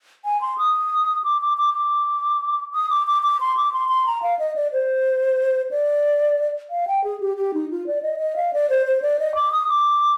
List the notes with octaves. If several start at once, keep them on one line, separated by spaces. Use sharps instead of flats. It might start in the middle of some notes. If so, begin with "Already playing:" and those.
G#5
C6
D#6
D6
D6
D6
D6
D#6
D6
D6
D6
C6
D6
C6
C6
A#5
F5
D#5
D5
C5
D5
F5
G5
G#4
G4
G4
D#4
F4
D5
D#5
D#5
F5
D5
C5
C5
D5
D#5
D6
D#6
D6